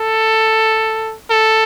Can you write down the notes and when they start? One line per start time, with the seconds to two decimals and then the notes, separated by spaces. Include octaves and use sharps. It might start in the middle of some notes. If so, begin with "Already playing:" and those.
Already playing: A4
1.30 A4